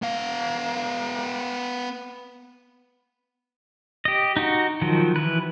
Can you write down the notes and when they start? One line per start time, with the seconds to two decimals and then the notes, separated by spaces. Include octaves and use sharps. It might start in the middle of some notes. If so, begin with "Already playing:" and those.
0.02 B3 F5
4.05 G4 D#5
4.36 D#4 F#4
4.81 D#3 F3 F#3
5.16 E3 B4